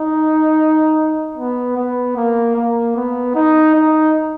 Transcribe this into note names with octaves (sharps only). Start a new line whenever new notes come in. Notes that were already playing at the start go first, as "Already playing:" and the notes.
Already playing: D#4
B3
B3
A#3
A#3
B3
D#4
D#4